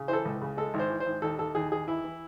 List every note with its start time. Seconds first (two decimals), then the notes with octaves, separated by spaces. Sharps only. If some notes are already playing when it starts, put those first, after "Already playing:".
Already playing: C#3
0.08 E3 C5
0.13 A4
0.25 C#2
0.42 C#3
0.57 G#3 A4
0.74 G#1
0.79 C5
0.90 E3
1.00 C5
1.06 G#1
1.22 D#2 A4
1.39 D#2 A4
1.55 D#2 G#4
1.71 D#2 G#4
1.88 E3 E4
2.04 E3